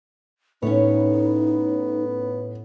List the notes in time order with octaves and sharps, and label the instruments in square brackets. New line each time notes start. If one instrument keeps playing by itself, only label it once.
[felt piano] A2 [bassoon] B3 [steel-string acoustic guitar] C#4 B4 C#5 [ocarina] D#4